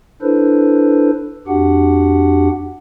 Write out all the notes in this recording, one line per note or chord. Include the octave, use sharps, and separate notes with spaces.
D4 E4 A4 B4 C5
F2 D4 F#4 G4 F#5